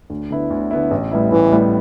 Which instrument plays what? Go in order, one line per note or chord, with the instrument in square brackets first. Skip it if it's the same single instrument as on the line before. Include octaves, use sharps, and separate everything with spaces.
[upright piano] D2
D3 B3 E4
D2
D3 B3 E4
A1
A2 G3 B3 E4
[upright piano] A1 [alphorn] E3
[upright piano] A2 G3 B3 E4